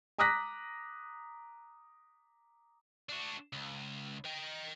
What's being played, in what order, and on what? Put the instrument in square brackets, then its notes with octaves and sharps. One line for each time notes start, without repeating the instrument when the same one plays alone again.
[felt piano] A#5 D6 D#6 F#6 A#6 B6
[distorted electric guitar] D4 F#4
C#2
D#5 G5